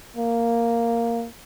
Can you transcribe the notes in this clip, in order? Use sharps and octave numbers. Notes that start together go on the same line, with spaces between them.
A#3